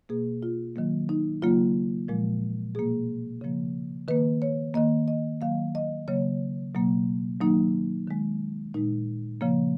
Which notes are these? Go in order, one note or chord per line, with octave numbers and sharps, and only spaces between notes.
B2 A#3 G#4
F4
D#3 F#3 A#3
D#4
C#3 F#3 A#3 F4
A#2 F3 G#3
B2 A#3 G#4
C#3 F3 A#3
D#3 A#3 B4
C#5
D#3 A#3 D#5
D#5
D#3 F#3 A#3 F5
D#5
C#3 F#3 A#3 C#5
B2 F#3 A#3
D#3 F#3 A#3 D#4
D#3 G#3
A#2 G#3 D#4
C#3 F3 A#3